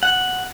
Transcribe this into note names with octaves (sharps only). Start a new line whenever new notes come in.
F#5